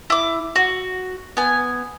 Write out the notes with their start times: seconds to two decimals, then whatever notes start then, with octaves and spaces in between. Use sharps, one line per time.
0.10 E4 D6
0.56 F#4
1.37 B3 G#5